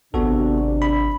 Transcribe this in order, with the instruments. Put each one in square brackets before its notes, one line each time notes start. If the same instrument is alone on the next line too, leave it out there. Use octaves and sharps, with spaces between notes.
[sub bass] G#1 [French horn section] C3 D4 [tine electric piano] B3 F#4 A4
[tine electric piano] B5